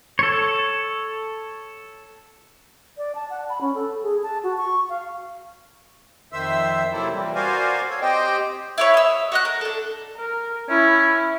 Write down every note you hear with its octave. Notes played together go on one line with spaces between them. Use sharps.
A4 C#5
D5
A5
F#5
B5
C#4
A4
G#4
A5
F#4
C#6
F5
F2 D#3 C5 E5 E6
C3 F#3 A#3 C4 E4 A4
A#2 E3 G3 C4
F#4 A#4 C5 D5 F5 G#5
A4 C#5 F5
C4 G4 C5 D#5 G5
E4 B4 C#5
D#5 E6
F#4 D#5 F#6
A#4
D4 A4
A#4
C#4 E4